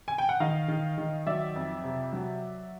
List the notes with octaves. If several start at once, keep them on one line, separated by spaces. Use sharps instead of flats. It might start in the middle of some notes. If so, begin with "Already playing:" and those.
G#5
G5
F#5
D#3 D#5 F5
D#3
D#3
F#3 D5 E5
F2
C3
F#3